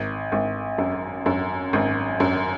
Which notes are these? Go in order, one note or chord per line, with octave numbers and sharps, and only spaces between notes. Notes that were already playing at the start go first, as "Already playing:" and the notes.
Already playing: G#1
G#1
F#2
F#2
G#1
F#2